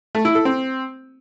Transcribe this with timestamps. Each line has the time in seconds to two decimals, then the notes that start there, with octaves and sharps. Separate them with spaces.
0.15 A3
0.25 E4
0.35 A4
0.45 C4